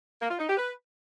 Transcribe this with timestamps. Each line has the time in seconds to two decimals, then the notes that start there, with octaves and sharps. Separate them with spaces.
0.20 A#3
0.30 F4
0.39 D#4
0.48 G4
0.57 B4